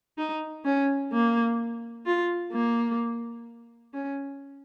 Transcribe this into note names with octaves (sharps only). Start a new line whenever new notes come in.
D#4
C#4
A#3
F4
A#3
C#4